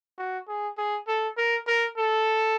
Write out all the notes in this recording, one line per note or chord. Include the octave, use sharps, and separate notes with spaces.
F#4
G#4
G#4
A4
A#4
A#4
A4